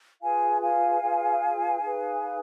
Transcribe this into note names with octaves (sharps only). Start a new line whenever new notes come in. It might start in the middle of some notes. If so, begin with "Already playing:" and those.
F4 G#4 B4 F5 G#5
F5 G#5
F4 G#4 B4
D#4 G#4 B4